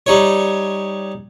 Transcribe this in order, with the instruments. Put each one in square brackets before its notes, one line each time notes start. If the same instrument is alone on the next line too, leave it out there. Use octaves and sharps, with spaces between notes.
[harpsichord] G3 D#4 C#5